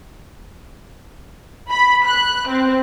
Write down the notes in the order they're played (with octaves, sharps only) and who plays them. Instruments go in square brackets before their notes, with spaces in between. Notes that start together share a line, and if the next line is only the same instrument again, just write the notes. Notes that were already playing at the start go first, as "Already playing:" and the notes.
[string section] B5
F#6
C4